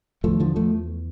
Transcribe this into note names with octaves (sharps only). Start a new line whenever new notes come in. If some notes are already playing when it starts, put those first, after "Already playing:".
E2 D3 F3 A3
D3 F3
F3 A3